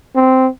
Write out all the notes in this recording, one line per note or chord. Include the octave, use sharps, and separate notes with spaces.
C4